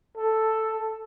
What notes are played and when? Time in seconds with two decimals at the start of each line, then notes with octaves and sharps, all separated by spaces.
0.17 A4